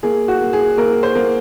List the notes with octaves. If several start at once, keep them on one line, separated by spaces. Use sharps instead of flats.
A#3 G#4
F#4
A#3
G#4
A#3 A#4
C5
A#3